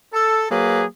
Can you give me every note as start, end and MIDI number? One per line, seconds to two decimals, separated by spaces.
0.14 0.49 69
0.51 0.85 54
0.51 0.85 58
0.51 0.85 68
0.51 0.85 71